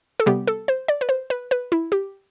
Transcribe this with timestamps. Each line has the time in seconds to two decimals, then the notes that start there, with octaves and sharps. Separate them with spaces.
0.20 A4
0.26 C3 G3 B3 G4
0.47 A4
0.68 C5
0.88 D5
1.01 B4
1.09 C5
1.30 B4
1.51 B4
1.72 E4
1.92 G4